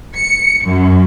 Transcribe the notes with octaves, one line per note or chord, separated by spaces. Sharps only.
C#7
F#2